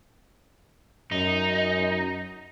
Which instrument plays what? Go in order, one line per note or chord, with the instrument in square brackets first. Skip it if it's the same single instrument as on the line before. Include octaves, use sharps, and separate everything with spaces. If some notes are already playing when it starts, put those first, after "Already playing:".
[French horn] F#2 [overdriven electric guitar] D#4